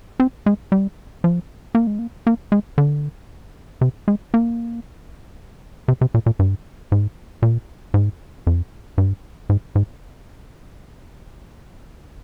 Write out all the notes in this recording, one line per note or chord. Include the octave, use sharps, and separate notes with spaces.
C4
G#3
G3
F3
A#3
G#3
A#3
A#3
G#3
D3
C3
G#3
A#3
C3
C3
A#2
A#2
G2
G#2
A#2
G#2
F2
G2
G#2
G#2